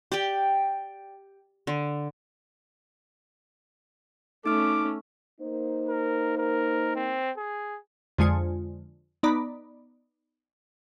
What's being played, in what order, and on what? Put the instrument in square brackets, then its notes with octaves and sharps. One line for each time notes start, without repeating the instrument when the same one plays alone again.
[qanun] G4 D5 G5
D3
[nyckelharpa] A3 C#4 [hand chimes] D#4 F6 [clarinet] D6
[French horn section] A#3 D#4 C5
[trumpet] A#4
A#4
C4
G#4
[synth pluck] F2 D3 G#3 F4 G#5 C#7
B3 D#4 D5 A#5 B5